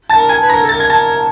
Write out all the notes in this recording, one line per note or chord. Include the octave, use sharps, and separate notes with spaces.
A5 A6
A#4
G#5 G#6
B4
A#5 A#6
A#4
A4
A#4 A6
G#6
A5 A6